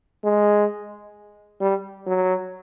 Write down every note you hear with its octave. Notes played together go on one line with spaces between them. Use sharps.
G#3
G3
F#3